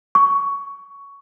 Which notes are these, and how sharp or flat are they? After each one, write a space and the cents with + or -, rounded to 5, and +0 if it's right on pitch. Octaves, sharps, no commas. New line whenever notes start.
C#6 +10